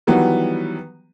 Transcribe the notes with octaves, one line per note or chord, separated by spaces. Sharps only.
D#3 E3 F#3 G3 B3